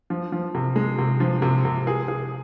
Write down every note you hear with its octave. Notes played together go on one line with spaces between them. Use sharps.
F3
F3
C3
G#3
C3
F3
C3
C3
G#4
G#4